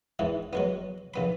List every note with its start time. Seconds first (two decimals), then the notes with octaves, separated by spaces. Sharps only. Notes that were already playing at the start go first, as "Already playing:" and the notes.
0.19 E2 G#2 E3
0.53 F#3 G#3 B3
1.14 A#1 B3 B5